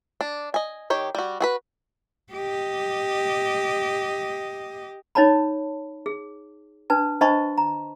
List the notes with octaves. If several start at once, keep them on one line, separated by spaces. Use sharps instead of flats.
D4
D#5 G#5
D#3 G4 C#5
G3 F#4
F#4 G#4 B4
G4 D#5
D#4 C#5 D5 A5 B5
G#4
D4 B4 A5
D4 C5 D#5 A5 B5 C#6
A#5